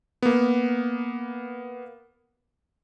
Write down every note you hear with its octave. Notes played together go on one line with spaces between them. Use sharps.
A#3 B3